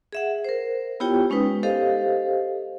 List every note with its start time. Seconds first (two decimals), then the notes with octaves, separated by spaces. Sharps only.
0.13 G#4 E5 F#5
0.45 A#4 C5
1.00 B3 E4 F4 G4 C#5 G5
1.30 G#3 C#4 D#4 B4 D#6
1.63 G4 A4 C5 D#5 F5